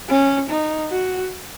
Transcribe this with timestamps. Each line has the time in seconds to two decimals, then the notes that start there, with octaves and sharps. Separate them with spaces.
0.09 C#4
0.50 D#4
0.91 F#4